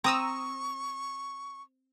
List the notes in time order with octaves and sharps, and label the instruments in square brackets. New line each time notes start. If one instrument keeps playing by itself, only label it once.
[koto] C4 [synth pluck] A#5 D#6 E6 [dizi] C#6